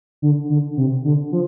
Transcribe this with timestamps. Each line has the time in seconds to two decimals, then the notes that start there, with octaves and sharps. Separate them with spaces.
0.22 D3
0.50 D3
0.77 C3
1.05 D3
1.32 F3